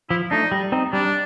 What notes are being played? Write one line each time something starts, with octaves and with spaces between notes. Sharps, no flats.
F3 E4
A3 D4 D#4
G3
C4 D#4
G3 D4